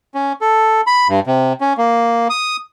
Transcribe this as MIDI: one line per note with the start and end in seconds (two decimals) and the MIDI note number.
0.15 0.33 61
0.41 0.81 69
0.87 1.08 83
1.09 1.20 43
1.27 1.53 48
1.61 1.73 61
1.77 2.28 58
2.30 2.57 87